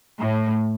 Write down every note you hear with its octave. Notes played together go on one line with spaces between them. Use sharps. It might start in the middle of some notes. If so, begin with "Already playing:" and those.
A2